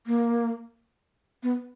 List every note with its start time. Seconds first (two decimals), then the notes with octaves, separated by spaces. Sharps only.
0.07 A#3
1.43 B3